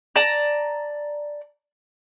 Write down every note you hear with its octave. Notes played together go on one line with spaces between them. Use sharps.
D5 A5 A#5